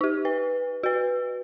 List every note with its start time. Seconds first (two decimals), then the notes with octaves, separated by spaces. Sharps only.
0.01 D#4 G4
0.25 B4
0.83 F#4 B4